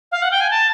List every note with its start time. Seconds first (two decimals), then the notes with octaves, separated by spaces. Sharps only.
0.12 F5
0.22 F#5
0.31 G5
0.41 G#5
0.51 A5